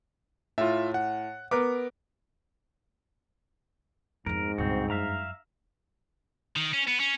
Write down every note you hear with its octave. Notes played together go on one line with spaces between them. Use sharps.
A2 F4 E5
F#5
B3 A#4 B4 D6
F2 G#2 B3 A#4
C#2 G2 A#2 C4 F#4
F#2 E5 F5 A#5
D#3
C#4
B3
C#4